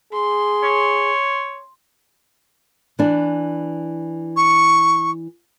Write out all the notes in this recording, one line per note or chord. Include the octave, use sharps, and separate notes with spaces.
G#4 C6
C#5
E3 D4
C#6